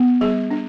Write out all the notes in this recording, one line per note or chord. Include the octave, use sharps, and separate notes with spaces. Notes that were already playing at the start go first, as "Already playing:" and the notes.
Already playing: B3
G3 G#4
D4